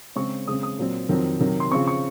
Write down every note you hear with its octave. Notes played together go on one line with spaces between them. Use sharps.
C#3 G#3 C4 C#6
C#3 G#3 C4 D#6
D#6
A#2 F#3 C4
F2 D#3 F#3 C4
C3 D#3 F#3
C6
C#3 F3 C4 C#6
C#6